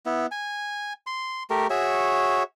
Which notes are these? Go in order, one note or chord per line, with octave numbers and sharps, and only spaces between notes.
B3 E4
G#5
C6
A3 G4 A#4
F#4 G#4 C#5 E5